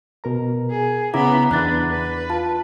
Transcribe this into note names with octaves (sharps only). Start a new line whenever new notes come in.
B2 A#4 A#5
G#4
C#3 B3 E4 A#5 B5 D6
E2 D4 E4 B4 F#6 A6
B4
F4 A5